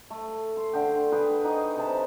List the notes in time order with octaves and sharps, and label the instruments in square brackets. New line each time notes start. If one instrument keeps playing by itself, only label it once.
[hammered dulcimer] A3
C6
D3 G5
G#4 B4 G5
D#4 G#4 C#5 D#5
C3 A5